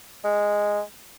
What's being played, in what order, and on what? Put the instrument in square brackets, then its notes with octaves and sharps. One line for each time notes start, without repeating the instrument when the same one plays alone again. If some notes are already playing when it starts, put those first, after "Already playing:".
[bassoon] G#3